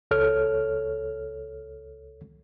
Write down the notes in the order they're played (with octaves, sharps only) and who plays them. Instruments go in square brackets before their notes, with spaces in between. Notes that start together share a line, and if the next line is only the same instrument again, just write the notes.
[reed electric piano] C#2 A4 C#5 F6